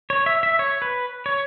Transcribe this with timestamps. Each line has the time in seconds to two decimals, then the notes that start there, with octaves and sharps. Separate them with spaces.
0.10 C#5
0.26 E5
0.43 E5
0.59 C#5
0.82 B4
1.26 C#5